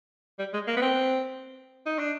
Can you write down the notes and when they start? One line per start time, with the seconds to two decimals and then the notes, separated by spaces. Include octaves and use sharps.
0.39 G3
0.53 G#3
0.67 A#3
0.77 B3
0.82 C4
1.86 D#4
1.99 D4